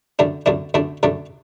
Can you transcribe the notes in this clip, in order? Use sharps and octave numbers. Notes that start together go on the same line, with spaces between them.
F#2 D3 A3 D4
F#2 D3 A3 D4
F#2 D3 A3 D4
F#2 D3 A3 D4